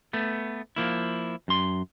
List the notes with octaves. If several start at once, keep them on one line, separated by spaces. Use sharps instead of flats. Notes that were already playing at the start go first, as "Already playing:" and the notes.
A3 B3
F3 A#3 E4
F#2 C6